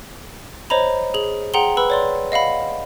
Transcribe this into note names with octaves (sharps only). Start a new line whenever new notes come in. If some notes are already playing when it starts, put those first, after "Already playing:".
C5 C#5 D#5 A#5 B5
G#4 F#7
G#4 F#5 G5 A#5 C6 G7
B4 B5 E6
C#5 D5 C6
D#5 F5 F#5 B5